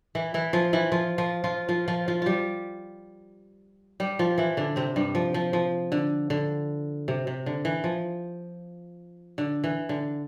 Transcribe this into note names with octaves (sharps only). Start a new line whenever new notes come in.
E3 E4
E3 E4
F3 F4
E3 E4
F3 F4
F3 F4
F3 F4
F3 F4
F3 F4
F3 F4
G3 F4 G4
G3 G4
F3 F4
E3 E4
D3 D4
C3 C4
G2 G3
F3
F3
F3
D3
D3
C3
C3
D3
E3
F3
D3
E3
D3